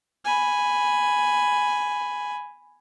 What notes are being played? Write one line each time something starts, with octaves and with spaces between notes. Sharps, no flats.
G#5 B5